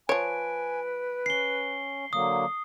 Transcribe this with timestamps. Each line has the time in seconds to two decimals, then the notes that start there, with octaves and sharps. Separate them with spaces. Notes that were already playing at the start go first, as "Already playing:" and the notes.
0.09 F3 B4 C#5 G#5 D7
1.26 C#4 C7 G7
2.13 D3 F#3 A#3 D#6